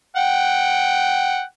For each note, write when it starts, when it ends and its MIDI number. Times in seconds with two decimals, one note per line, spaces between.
0.16 1.42 78
0.16 1.42 79